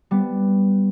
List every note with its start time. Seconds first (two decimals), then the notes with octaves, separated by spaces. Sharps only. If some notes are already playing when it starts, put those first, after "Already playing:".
0.11 G3 B3